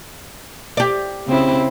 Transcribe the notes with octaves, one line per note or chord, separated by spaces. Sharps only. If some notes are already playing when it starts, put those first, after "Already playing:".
G4 D5
C#3 C4 E4